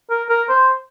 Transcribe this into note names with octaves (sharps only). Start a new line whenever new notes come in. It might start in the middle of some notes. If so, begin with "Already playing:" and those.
A#4
A#4
C5